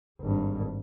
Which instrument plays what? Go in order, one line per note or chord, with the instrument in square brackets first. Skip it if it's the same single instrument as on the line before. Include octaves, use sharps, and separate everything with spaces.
[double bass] G#1 G2